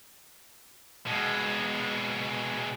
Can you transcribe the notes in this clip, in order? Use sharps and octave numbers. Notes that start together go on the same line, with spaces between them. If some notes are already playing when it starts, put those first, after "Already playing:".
B2 G#3